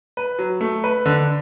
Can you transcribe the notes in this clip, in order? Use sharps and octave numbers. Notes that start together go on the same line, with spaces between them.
B4
F#3
A3
B4
D3